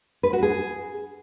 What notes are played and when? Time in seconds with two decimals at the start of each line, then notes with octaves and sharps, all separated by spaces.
0.23 B4
0.33 F#4
0.43 G#4